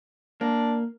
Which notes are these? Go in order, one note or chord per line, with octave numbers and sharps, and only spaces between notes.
A#3 D4